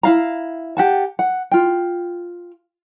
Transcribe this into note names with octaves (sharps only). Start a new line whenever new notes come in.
E4 F5 A#5
G4 F#5 A5
F#5
F4 G5